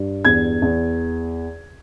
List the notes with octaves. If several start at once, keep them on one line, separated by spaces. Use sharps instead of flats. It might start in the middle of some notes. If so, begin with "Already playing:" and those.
Already playing: G2
E2 G#6
E2